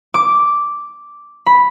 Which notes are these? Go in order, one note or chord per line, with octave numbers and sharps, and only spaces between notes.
D6
B5